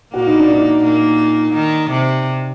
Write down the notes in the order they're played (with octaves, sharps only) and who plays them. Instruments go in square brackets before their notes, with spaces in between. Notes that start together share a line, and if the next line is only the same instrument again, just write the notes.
[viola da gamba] A#2 A#3 [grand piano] F#4
[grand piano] D#4
D4
D#4
[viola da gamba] A#2 A#3
D#3
C3